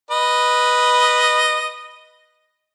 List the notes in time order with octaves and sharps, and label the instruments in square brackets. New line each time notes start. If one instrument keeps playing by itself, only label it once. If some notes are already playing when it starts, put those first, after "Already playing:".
[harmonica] B4 D#5